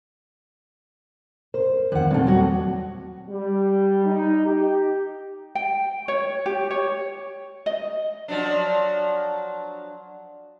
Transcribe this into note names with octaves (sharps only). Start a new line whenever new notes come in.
A#4 C5
E2 G2 D#3 F3 F#5
A#2 G3 A3 C4
D#2 F#3 F#4
G3
D#4
G4
G5
C#5
G4
C#5
D#5
F3 F#3 D4